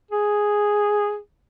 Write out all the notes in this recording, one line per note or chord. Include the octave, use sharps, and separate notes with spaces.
G#4